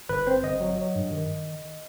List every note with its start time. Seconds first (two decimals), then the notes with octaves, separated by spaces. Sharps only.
0.09 G1 B4
0.27 C4 C5
0.44 G1 D#5
0.61 F#3
0.78 F#3
0.95 G2
1.12 D#3